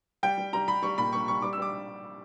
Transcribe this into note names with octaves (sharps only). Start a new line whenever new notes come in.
G3 G5
G3
G3 A#5
G3 B5
G3 C#6
A#2 B5
G3 C#6
G3 C#6
G3 D6
E6
G3 D6